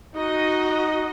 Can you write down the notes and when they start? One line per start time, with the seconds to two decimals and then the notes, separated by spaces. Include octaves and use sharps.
0.15 D#4 F#4 D#5